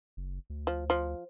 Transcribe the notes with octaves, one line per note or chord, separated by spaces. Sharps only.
F#1
D2
F3
F3